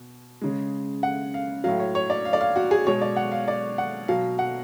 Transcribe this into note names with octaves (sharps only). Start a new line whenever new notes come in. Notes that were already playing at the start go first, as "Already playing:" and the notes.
Already playing: B2
C#3 G#3
F#5
F5
A2 F#3 F5
C#5
C#5
D5
F5
D5
F5
F#4
G#4
B2 G#3 C#5
D5
F#5
F5
D5
F#5
B2 F#3 F5
F#5